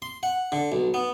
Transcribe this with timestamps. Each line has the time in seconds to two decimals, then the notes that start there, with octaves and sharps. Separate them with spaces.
0.02 C6
0.23 F#5
0.52 D3
0.72 B1
0.94 B3